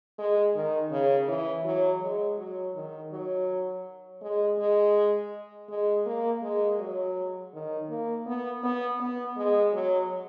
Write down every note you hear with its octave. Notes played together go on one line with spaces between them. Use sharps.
G#3
D#3
C#3
E3
F#3
G#3
F#3
D#3
F#3
G#3
G#3
G#3
A#3
G#3
F#3
D#3
A#3
B3
B3
B3
G#3
F#3